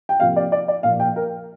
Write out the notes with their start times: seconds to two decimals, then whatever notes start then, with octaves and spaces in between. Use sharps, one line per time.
0.09 G5
0.20 C3 F3 A#3 F5
0.36 D5
0.52 D5
0.68 D5
0.83 A#2 F3 A#3 F5
1.00 G5
1.16 A#4